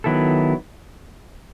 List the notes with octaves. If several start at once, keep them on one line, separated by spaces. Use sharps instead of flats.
D#3 F#3 B3 E4 A4